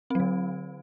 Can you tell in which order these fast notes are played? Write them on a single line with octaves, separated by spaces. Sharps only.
C4 F#3 D3